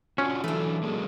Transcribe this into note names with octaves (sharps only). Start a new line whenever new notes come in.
C#4 D4 F4 F#4
E3 F#3 A3 D4
F#3 G#3 A#3